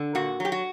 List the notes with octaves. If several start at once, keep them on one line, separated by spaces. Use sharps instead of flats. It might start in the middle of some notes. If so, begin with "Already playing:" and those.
Already playing: D3
A#2 F#4
F#3 G4
F#4